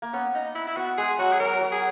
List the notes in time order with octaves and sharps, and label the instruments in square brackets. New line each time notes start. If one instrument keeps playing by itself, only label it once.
[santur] A#3
[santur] B3 [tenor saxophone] C#4
[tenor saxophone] D#4
E4
E4
[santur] B3 [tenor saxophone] F#4
[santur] G#3 [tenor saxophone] G#4
[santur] F#3 [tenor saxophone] F#4
[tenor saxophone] G#4
[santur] F#3 [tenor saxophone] A#4
[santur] F#3
[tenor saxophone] G#4